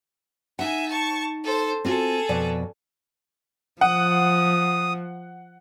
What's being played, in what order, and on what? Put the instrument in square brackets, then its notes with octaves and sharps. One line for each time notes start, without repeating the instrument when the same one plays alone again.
[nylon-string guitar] D#4 F#5 [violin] E5 G#5
[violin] A5 C#6
A4 C5
[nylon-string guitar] C4 F4 F#4 [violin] G#4 A4
[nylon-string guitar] F2 B2 D5
[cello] F3 [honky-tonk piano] F#5 [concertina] D#6